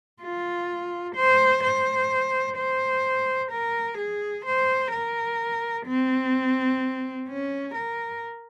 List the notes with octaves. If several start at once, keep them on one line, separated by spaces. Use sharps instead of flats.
F4
C5
C5
C5
A#4
G#4
C5
A#4
C4
C#4
A#4